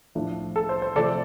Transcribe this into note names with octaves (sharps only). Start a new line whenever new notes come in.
A2 F3 A3 D4
A4
C5
C5
C3 F3 A3 C4 A4 D5